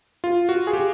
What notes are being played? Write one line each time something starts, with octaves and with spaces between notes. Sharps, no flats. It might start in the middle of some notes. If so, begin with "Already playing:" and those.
F4
F#4
G#4
G4